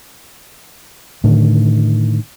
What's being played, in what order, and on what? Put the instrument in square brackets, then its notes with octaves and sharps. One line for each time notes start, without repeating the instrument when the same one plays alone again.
[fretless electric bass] A2 D3 D#3